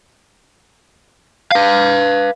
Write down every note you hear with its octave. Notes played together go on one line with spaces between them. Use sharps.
B4 F5